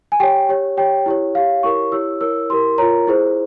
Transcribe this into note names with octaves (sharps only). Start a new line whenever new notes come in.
G#5
G4 C#5 G5
G4 C#5
G4 C#5 G5
E4 G4 C#5
G4 C#5 F5
E4 G4 A#4 C#5 C#6
E4 G4 C#5 E6
E4 A#4 C#5 E6
E4 G4 A#4 C6
F4 A#4 C#5 A#5
E4 G#4 C5